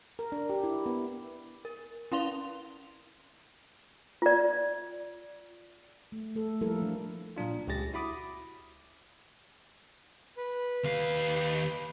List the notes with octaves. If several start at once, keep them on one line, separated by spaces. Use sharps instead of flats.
A#4
D4
G4
E4
B3
A#4
C#4 E4 F5 C6 F7 G7
F4 D5
A3
A3 A4
F3 G3 A#3 E4 A4 A#4
E3 D4 A4
A#2 F#3 D4 F4
C#2 C#3 G4 G#4 A6 A#6
E4 F#4 B5 D6 D#6
B4
D#2 F5